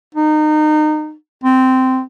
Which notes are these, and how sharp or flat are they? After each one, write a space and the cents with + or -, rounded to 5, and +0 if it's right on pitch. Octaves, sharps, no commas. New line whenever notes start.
D#4 -25
C4 -10